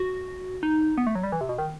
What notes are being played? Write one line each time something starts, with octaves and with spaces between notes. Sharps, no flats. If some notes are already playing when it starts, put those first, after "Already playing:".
Already playing: F#4
D#4
B3
A3
F#3
G3
E3
C3
B2
D#3